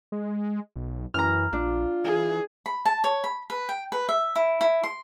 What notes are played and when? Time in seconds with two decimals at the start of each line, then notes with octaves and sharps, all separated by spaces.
0.12 G#3
0.76 B1
1.14 F#2 E3 A#5 F6
1.53 A#1 D4 F4
2.04 E3 G#4
2.66 B5
2.85 A5
3.04 C#5
3.24 B5
3.50 B4
3.69 G5
3.92 B4
4.09 E5
4.36 E4
4.61 E4
4.84 C6